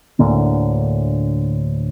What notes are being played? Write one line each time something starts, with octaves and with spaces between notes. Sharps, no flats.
D2 A2 D3 A#3